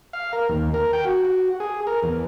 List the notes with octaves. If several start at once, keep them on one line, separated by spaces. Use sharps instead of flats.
F5
A#4
D#2
A#4
G5
F#4
F#4
G#4
A#4
E2